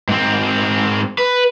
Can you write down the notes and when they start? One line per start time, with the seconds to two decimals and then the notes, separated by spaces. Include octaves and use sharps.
0.09 G#2 C4
1.18 B4